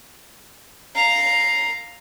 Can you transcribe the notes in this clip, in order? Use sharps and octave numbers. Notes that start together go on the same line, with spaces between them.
F5 A#5